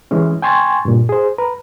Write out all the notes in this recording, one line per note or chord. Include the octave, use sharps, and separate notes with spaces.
E3 G#3 C#4
G5 G#5 C6 C#6 G#6 A6
G2 A#2
G#4 C5
B4 A#5